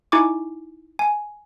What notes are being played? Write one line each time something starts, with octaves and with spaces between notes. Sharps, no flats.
D#4 E4 G#5 C#6 D6
G#5